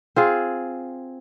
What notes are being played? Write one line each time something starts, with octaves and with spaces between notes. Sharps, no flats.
C4 F4 G#4